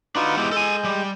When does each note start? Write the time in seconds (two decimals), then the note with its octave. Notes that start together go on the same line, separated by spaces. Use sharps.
0.15 D4 D#4 F4 F#4 B4
0.37 G#3 B3 E4 G4 G6
0.52 A4 G#5
0.84 G3